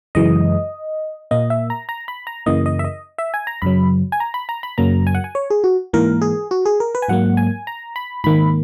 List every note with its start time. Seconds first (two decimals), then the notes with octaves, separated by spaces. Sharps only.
0.15 F#2 C#3 E3 G#3 D#5
1.31 A#2 A#3 D#5
1.50 E5
1.70 A#5
1.89 A#5
2.08 B5
2.27 A#5
2.46 F#2 C#3 E3 A#3 D#5
2.66 D#5
2.79 E5
2.84 D#5
3.18 E5
3.34 G#5
3.47 A#5
3.62 F#2 C#3 F#3 B5
4.12 G#5
4.20 A#5
4.34 B5
4.49 A#5
4.63 B5
4.78 F#2 C#3 F#3 A#3 A#5
5.07 G#5
5.15 F#5
5.24 G#5
5.35 C#5
5.50 G#4
5.64 F#4
5.93 G#2 E3 A#3 A#4
6.21 G#4
6.51 F#4
6.65 G#4
6.80 A#4
6.95 B4
7.02 G#5
7.08 G#2 F#3 A#3 F#5
7.37 G#5
7.67 A#5
7.96 B5
8.24 G#2 D#3 A#3 B5